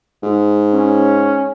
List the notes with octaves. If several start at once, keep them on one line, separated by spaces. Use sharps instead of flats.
G#2
C#4